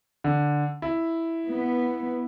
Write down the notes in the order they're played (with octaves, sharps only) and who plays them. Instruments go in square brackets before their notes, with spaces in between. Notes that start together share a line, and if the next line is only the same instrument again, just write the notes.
[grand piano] D3
E4
[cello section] B3